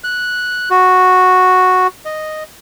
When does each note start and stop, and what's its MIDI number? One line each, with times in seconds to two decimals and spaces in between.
0.04 0.69 90
0.70 1.87 66
2.05 2.43 75